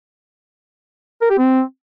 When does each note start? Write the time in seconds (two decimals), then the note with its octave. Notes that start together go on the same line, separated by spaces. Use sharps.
1.22 A#4
1.30 G4
1.38 C4